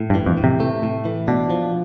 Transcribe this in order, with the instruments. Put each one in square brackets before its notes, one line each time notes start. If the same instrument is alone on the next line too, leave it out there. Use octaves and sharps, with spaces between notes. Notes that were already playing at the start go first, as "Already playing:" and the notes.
Already playing: [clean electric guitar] A2
[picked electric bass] G2
[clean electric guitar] E3
[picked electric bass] F2
[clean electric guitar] A2
[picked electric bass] C3
[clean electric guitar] A3
A2
E3
[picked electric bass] B2 [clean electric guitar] D4
[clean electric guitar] F3